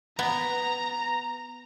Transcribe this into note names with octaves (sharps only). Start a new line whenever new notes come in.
B3 A#5